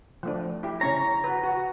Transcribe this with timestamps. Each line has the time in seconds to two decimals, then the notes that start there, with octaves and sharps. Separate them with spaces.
0.23 F3 A3 D4
0.63 E4 G4
0.81 C#3 C#4 C#5 A#5
1.24 F#4 B4
1.43 F#4